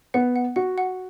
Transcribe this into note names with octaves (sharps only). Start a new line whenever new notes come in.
B3 F#5
F#5
F#4 F#5
F#5